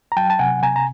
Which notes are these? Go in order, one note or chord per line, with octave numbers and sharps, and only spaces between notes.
A#5
F#3 G5 A5
A5
C3 F#5 G#5
C3 G#5 A#5
A#5